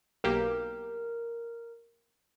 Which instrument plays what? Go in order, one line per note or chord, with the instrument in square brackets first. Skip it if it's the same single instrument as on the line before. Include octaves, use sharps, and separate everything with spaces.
[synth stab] B1 A#3 G4 [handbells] A#4